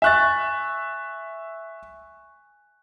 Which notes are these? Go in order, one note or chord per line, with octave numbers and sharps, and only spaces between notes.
E5 G#5 C#6 F#6 A6